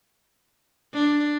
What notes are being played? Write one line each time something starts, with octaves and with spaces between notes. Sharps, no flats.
D4